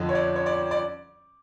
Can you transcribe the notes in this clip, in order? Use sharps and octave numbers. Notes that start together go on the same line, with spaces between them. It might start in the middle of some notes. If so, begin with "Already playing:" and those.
Already playing: F2 D3 F3 D#5
C#5
D5
C#5
D5
D5